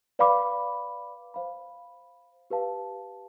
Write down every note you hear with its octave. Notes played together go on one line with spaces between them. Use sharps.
B4 D5 F5 B5 D6
C5 F5 B5
G4 B4 F5 A5